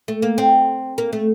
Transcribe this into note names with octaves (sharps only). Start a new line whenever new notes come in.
A3
A#3
C4
A#3
A3